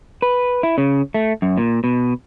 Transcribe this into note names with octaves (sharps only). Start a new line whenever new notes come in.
B4
E4
C#3
A3
F#2
A#2
B2